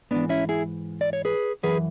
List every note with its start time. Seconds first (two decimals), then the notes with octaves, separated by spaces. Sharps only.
0.11 G#2 E3 B3 D4
0.29 C#4 E4
0.49 E4 G#4
1.01 D5
1.13 C#5
1.25 G#4 B4
1.63 F#2 E3 G#4 B4